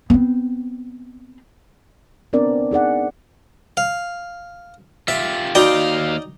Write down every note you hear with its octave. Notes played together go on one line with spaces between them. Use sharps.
B3 C4
B3 C4 D4 A#4 D5
D#4 G#4 D5 F#5
F5
F4 G4 E5
D#2 D#4 F#4 D5 D#5 F5 G5